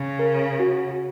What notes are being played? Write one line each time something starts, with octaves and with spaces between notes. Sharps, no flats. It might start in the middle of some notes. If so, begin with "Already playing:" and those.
Already playing: C#3
A#4
F#4